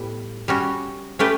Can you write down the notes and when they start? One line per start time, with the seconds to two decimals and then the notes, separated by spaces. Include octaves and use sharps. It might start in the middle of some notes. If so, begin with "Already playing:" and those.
Already playing: A2 G3 B3
0.48 G3 C#4 F#4
1.19 A3 C#4 G4 B4